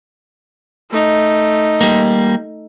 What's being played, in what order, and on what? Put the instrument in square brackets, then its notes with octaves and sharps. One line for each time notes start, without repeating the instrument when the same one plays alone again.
[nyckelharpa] A3 D#4
[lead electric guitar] G3 A#3